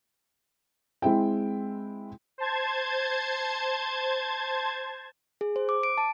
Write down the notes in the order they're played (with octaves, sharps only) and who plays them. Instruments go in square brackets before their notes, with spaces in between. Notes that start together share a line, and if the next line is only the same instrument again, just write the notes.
[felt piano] G#3 C4 E4 G5
[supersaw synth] C5 A5 G#6
[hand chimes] G#4
C5
D6
D7
A5